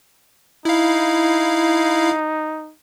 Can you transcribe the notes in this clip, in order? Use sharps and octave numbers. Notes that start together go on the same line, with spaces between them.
D#4 E4 F5